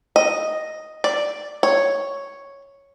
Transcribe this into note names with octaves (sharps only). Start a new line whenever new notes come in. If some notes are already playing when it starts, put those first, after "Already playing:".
D#5
D5
C#5